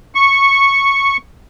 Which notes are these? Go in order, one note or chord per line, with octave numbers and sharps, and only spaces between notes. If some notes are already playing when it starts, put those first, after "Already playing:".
C#6